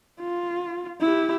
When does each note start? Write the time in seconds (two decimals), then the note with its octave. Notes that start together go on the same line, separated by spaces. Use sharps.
0.20 F4
1.01 E4 G4